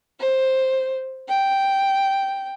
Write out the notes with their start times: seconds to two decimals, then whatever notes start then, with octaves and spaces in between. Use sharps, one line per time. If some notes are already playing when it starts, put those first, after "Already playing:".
0.20 C5
1.28 G5